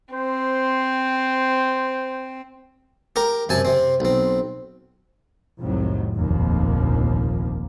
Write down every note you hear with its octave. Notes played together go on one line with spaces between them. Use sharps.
C4 C5
G4 A#4 A#5
F#2 C3 G#5 A5
C3 C4
B1 C4
C2 F2 A2 C3 D#3 F#3
F1 A#1 D#2 D3 F3 A#3